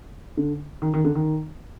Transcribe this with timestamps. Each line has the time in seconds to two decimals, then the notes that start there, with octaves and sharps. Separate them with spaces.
0.37 D3
0.82 D#3
0.94 D#3
1.05 D3
1.15 D#3